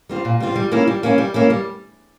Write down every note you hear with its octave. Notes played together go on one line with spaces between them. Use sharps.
G3 C4 F4
A#2
G3 C4 F4
G3
A#3 C#4 E4
G3
A#3 C#4 E4
G3
A#3 C#4 E4
G3